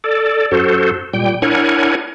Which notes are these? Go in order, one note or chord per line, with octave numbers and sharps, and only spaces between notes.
A4 D5
F#2 F#4 A4 C5
A#2 G3 G5
D4 E4 A#4 C#5 F#5 G#5